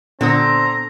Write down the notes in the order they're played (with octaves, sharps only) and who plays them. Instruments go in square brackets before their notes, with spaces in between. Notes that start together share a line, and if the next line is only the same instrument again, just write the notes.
[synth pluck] A#2 B3 D#6 [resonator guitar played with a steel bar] D3 [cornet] C4 [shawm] A#5